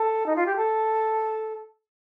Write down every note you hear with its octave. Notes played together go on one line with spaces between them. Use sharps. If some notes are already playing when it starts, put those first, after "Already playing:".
Already playing: A4
D#4
F4
G4
A4